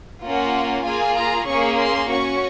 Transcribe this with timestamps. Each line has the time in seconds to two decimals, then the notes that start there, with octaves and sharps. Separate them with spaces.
0.24 A#3 C#4 F4 F#5
0.85 A#3 F4 G#4 G#5
1.17 A#5
1.47 A#3 C#4 G#4 C#6
1.78 C6
2.09 C#4 F#4 C#6